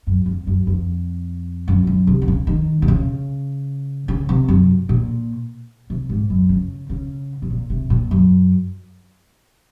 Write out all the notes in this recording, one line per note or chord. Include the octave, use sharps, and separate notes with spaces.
F#2
F2
F#2
F2
F#2
F#2
C3
D#3
C#3
D#3
C3
C#3
C#3
C3
F#2
A#2
C3
G#2
F#2
C#3
C#3
C3
A#2
C3
A#2
F#2